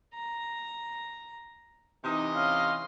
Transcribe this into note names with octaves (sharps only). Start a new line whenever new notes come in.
A#5
C3 E3 D#4 D#5
C#4 F5 C6